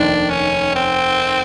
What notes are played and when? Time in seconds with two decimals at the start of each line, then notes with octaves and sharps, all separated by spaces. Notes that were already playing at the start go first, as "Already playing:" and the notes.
Already playing: F1 D#2 D#3 D4
0.30 C#4
0.75 C4